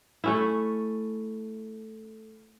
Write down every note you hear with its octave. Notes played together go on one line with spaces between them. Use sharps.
A3 C#4 E4